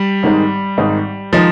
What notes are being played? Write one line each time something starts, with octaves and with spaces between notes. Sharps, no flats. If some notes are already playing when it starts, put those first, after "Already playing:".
Already playing: G3
G#1 G#2 D#3 G#3 D#4
G#1 G#2 D#3 G#3 D#4
D#3 F3 G#3 D#4